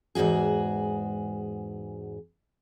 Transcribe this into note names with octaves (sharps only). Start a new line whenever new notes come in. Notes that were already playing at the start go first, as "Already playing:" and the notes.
E2 G#2 B2 F#4 G#4